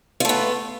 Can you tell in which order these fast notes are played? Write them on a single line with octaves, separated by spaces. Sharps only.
F4 A3 B3